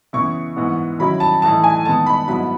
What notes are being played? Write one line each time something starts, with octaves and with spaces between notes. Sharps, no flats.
C#3 E3 B3 E4 C#6
G#2 E3 B3
D#3 F#3 C#4 E4 B5
A5
A2 E3 A3 D#4 A5
G#5
D#3 G#3 B3 D#4 A5
B5
G#2 F#3 B3 E4 B5